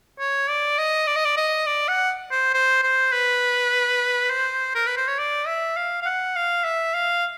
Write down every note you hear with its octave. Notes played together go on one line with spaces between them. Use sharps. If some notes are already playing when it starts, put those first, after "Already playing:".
C#5
D5
D#5
D5
D#5
D5
D#5
D5
F#5
C5
C5
C5
B4
C5
A#4
B4
C5
C#5
D5
E5
F5
F5
F#5
F5
E5
F5